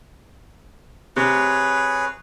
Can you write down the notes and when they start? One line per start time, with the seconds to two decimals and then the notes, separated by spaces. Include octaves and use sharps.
1.16 C3 G#4 B4 C#5